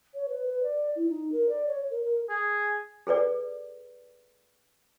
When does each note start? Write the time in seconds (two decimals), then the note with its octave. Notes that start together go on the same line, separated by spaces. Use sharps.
0.14 C#5
0.28 B4
0.46 B4
0.63 D5
0.96 E4
1.09 D#4
1.32 A#4
1.49 D5
1.67 C#5
1.90 A#4
2.04 A#4
2.30 G#4
3.07 G#4 A4 B4 D5